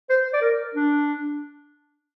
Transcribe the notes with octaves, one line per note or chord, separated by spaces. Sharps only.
C5
D5
A#4
D4